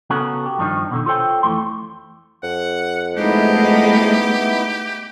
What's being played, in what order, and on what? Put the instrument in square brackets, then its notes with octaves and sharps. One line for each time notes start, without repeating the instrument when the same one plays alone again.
[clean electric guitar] C#3 B3 C#4 F#4 A4 A#4
G4
G2 D#3 F3 D4 D#4
B2 D3 D#3
F4 A4 C5 C#5 G5
F2 E3 A3 C6
[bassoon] F2 [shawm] F#5
[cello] G#3 A3 [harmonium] B3 D#4 E4 [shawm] G4